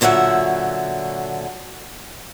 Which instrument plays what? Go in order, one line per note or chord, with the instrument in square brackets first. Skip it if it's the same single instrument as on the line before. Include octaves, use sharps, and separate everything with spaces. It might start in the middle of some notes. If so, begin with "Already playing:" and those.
[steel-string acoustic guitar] A#2 D3 F#3 E5 F#5